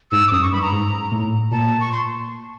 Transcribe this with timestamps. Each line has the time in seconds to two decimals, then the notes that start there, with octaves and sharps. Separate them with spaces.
0.11 G#2 E6
0.27 D6
0.31 F#2 D#6
0.42 C#6
0.52 G2 B5
0.62 A#5
0.72 G#2
1.11 A2
1.51 A#2 A5
1.80 C#6
1.92 C6